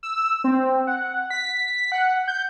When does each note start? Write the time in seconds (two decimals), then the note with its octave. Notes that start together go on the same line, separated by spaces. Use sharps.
0.03 E6
0.44 C4
0.87 F#5
1.30 B6
1.92 F#5
2.28 G6